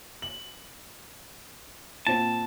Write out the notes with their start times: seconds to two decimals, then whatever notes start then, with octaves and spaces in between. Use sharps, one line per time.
0.22 F#7
2.07 A#2 C4 A5